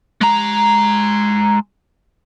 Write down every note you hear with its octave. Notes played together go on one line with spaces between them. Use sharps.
G#3 A#5